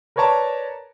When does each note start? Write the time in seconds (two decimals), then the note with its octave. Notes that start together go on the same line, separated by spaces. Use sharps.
0.16 A#4 B4 C#5 D5 A5 A#5